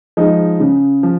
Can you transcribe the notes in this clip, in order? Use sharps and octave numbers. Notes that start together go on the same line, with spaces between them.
F3 G#3 D#4
C#3
F3